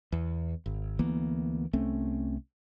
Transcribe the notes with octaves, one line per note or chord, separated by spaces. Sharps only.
E2
G#1
D2 E3 A#3 B3
C2 A3 C4 C#4